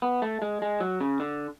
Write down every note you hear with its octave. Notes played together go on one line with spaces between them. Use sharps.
B3
A3
G#3
G#3
F#3
C#3
D3